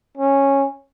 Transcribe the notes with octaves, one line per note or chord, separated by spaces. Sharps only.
C#4